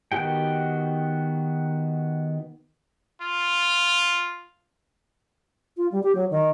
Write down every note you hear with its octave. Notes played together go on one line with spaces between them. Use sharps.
D#3 B3 F#4 G4 G5
F4
F4
G3
G4
F#3
D#3